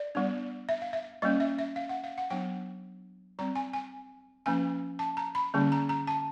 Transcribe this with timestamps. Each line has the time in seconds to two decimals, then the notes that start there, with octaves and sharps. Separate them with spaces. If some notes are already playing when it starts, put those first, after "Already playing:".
Already playing: D5
0.15 G3 B3 D4
0.69 E5
0.82 F5
0.93 E5
1.22 G3 A#3 C#4 D#5
1.40 E5
1.59 E5
1.76 F5
1.89 F#5
2.04 F5
2.18 F#5
2.30 F#3 B3 D4 G5
3.39 G3 C4 A#5
3.55 G#5
3.73 G#5
4.46 F3 A#3 C#4 G#5
4.99 A5
5.17 A#5
5.35 B5
5.54 D3 G3 A#3 C#4
5.72 A#5
5.89 A#5
6.07 A5